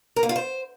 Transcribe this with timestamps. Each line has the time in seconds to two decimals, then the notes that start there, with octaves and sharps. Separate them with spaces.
0.16 A#4
0.23 A#3
0.29 F4
0.36 C5